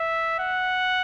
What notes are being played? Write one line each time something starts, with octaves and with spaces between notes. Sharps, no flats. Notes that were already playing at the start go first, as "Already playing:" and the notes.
Already playing: E5
F#5